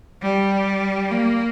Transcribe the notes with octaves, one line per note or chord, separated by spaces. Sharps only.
G3
A#3